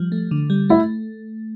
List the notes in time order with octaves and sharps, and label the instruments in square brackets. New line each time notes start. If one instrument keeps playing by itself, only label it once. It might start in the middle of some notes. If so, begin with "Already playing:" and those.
Already playing: [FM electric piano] F3 G3
A3
D3
G3
[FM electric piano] A3 [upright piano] E4